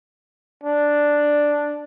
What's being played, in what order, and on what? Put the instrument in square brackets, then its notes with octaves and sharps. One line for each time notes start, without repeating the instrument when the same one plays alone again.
[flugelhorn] D4